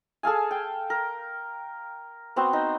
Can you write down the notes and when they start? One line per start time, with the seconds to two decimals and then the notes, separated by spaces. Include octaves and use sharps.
0.23 G#4 A4 F5 G#5
0.51 G5
0.90 A#4
2.36 B3 C4 F#4
2.53 D#4